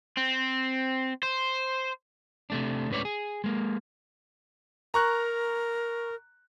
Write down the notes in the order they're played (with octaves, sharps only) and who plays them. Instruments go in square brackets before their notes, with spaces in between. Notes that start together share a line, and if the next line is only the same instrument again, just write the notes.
[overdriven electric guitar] C4
C5
[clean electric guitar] C3 A3 D4
C#2 A2 C#3 B4 C#5 D5
G#4
G#3 A#3
[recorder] A#4 [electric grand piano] A#5 C#6 F#6